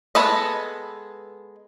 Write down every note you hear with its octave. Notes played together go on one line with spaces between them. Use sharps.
G#3 B3 A4 B4 D#5